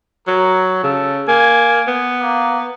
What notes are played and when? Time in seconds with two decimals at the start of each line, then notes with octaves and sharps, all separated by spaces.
0.27 F#3 A#4
0.84 C#3 A4
1.28 A#3 G#5
1.88 B3
2.22 A#3